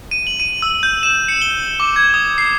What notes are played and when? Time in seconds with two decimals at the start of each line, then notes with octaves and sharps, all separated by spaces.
0.11 D#7
0.27 F#7
0.40 D#7
0.62 E6
0.83 G6
1.03 E7
1.28 C#7
1.42 G7
1.80 D6
1.96 G#6
2.14 D#6
2.38 C7